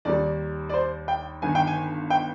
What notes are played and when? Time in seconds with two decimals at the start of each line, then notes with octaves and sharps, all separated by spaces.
0.05 D#2 D#3 G3 D5
0.69 D5
0.74 C5
1.08 G5
1.42 G1 G2 D#3 G#5
1.55 G5
1.67 G#5
2.10 G5